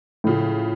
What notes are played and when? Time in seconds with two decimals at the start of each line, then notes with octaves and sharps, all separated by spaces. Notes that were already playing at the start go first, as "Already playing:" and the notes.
0.24 A2 C#3 F3